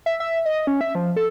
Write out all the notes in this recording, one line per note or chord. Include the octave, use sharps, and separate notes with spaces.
E5
E5
D#5
C#4
E5
F3
A4